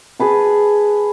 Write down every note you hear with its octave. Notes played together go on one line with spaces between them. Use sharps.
G#4 B4 A5